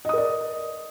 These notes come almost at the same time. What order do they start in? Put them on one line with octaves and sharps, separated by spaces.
D#5 D#6 A#4 D5